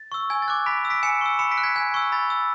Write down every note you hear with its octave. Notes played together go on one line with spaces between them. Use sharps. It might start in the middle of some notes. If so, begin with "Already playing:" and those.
Already playing: A6
C#6 E6
G#5 G#6
A6
D6 F#6
B5 B6 D7
E6
B6 D7
G#5 C#7 E7
C#6 E6
B5 C#7 E7
B6 D7
F#6
G#6 B6
G#5 G#6
C#6 E6
B5 A6
E6